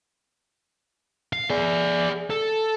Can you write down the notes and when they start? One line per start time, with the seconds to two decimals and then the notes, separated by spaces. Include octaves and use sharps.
1.33 F5
1.50 G#4 D5
2.30 A4